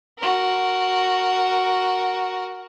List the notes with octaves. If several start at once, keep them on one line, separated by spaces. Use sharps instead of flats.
F#4 A#4